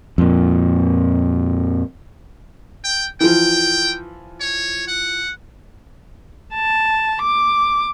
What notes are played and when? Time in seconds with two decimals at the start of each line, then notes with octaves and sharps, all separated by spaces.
0.18 F2 A#2
2.84 G5
3.20 E3 F3 G5
4.40 C#5
4.88 F#5
6.53 A5
7.23 D6